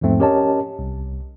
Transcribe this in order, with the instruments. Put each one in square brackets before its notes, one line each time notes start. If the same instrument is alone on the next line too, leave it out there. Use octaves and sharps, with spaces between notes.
[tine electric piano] E2 G#2 F3 A3 C4
C#4 G4 A#4 C#5 D#5 A5
C2